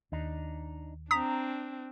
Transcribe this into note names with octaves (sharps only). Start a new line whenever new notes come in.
D#2 D4 D#4
C4 D4 A#5 D#6 B6